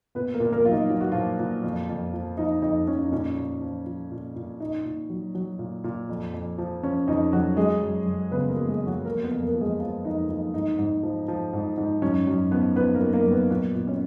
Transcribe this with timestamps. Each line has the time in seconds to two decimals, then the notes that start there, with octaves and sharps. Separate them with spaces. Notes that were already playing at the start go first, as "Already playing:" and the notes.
0.15 A#2 B3 B4
0.34 A#3 A#4
0.40 A#2
0.52 A#3 A#4
0.65 F#3 F4
0.71 D#4
0.90 F#3 F4
1.01 F#4
1.12 A#2 F3 F4
1.39 A#2
1.63 F2
1.89 F2
2.14 F3
2.38 F3 D#4
2.62 F2 D#4
2.87 F2 C#4
3.03 D#4
3.13 A#2 C#4
3.37 A#2
3.61 F3
3.86 F3
4.11 A#2
4.36 A#2
4.60 A#2 D#4
4.85 A#2
5.10 F#3
5.35 F#3
5.59 A#2
5.84 A#2
6.09 F2
6.34 F2
6.58 F3
6.83 F3 C#4
7.08 F2 D#4
7.33 F2 F#3 F#4
7.57 F#3 G#3 G#4
7.82 F#2
8.06 F#2
8.31 C#3 B3 B4
8.50 A#3 A#4
8.56 F#3
8.68 G#3 G#4
8.81 F#2
8.87 F#3 F#4
9.05 F2 A#3 A#4
9.23 B3 B4
9.31 F2
9.42 A#3 A#4
9.55 F3
9.61 G#3 G#4
9.80 F3 F4
10.04 F2 D#4
10.29 F2 D#4
10.54 G#2 D#4
10.79 G#2
11.03 F3
11.28 F3
11.53 G#2
11.77 G#2
12.02 F#2 C#4
12.27 F#2
12.51 F3 B3 B4
12.76 F3 B3 B4
12.95 A#3 A#4
13.01 F#2
13.14 A#3 A#4
13.26 F#2
13.32 B3 B4
13.50 A#2 B3 B4
13.75 A#2
13.87 C#4 C#5